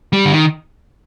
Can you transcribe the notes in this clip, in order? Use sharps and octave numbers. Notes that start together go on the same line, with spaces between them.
G3
D3
D#3